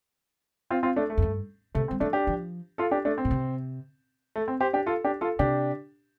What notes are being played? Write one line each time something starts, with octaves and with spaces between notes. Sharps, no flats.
C4 F4
C4 F4
A3 D4
A3
F2
G2
C3 A3
C4
G3
F3 A3 D4
D4 G4
F3
F4 A4
D4 G4
A3 D4
C4
A2
C3
A3
C4
G4 C5
D4 G4
F4 A4
D4 G4
F4 A4
C3 D4 G4